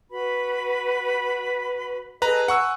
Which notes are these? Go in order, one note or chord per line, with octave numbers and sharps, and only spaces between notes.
F#4 B4 B5
G#4 A4 B4 D#5 A#5
F#5 G#5 C#6 E6